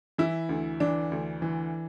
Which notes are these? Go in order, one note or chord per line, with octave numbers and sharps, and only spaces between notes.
E3 E4
D2
E3 D4
D2
E3